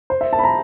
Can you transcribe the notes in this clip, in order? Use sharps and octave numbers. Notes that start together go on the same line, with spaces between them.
C5
E5
A5
B5
A#5